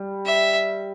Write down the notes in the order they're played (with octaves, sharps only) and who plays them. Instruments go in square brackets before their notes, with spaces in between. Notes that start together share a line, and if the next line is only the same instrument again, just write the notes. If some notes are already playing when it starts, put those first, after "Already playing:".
Already playing: [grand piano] G3
[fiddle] E5